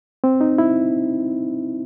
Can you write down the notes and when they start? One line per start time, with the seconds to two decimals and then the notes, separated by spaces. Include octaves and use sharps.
0.24 C4
0.41 D#4
0.58 E4